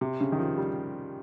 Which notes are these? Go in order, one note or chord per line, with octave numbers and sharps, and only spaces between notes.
C3
C#3
D#3
F3
G3